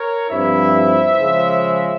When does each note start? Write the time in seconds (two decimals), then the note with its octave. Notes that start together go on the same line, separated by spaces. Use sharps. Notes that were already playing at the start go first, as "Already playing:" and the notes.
Already playing: A#4 C#5
0.29 G2 F3 C4 E4 C5 E5
1.19 C#3 F3 G#3